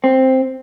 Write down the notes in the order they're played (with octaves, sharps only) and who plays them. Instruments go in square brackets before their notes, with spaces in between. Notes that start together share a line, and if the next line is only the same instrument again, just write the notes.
[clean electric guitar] C4